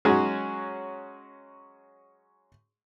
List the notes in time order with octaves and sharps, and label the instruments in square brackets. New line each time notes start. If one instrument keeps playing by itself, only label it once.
[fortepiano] F#3 G#3 C#4 F#4 G#4